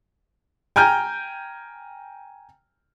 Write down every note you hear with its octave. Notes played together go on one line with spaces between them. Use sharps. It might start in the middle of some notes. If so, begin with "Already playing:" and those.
G5 G#5 A#5 F6 G6